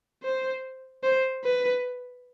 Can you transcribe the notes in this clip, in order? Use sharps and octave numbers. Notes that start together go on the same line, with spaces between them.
C5
C5
B4